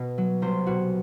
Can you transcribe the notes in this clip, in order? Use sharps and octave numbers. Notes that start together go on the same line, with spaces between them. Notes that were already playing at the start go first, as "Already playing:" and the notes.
Already playing: B2 D#5
F#3
C2 C5
B2 F#4